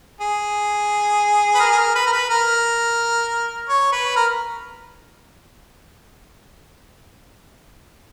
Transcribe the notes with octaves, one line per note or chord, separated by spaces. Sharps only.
G#4
B4
A#4
G#4
A#4
B4
A#4
B4
A#4
C#5
B4
A#4